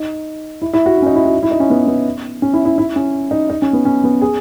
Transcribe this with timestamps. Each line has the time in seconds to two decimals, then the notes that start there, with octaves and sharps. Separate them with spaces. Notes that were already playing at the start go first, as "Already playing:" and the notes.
Already playing: D#4
0.62 E4
0.73 E4
0.86 F#4
0.98 E4
1.02 C#4
1.06 D#4
1.16 E4
1.25 F#4
1.43 E4
1.51 D#4
1.60 C#4
1.70 B3
1.87 B3
2.42 C#4
2.53 E4
2.65 E4
2.78 E4
2.96 C#4
3.31 D#4
3.50 D#4
3.62 C#4
3.73 B3
3.85 C#4
4.04 B3
4.21 G#4